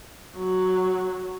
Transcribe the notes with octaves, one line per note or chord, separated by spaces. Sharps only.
F#3